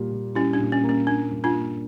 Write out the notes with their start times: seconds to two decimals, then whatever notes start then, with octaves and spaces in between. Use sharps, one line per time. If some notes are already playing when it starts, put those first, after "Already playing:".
Already playing: A#2 G3
0.11 A#2
0.35 G3 C#4 E4
0.53 D4
0.59 A#2
0.72 C#4
0.84 A#3
0.89 C#4
1.07 A#3 D4
1.31 G2
1.44 D4 F4
1.55 A#3